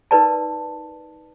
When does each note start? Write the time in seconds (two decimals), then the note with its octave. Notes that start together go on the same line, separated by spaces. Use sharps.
0.11 D#4 A#4 B4 D5 A5